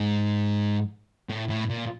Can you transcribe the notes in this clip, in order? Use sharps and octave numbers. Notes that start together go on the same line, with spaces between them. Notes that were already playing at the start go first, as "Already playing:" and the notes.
Already playing: G#2
A2
A2
A#2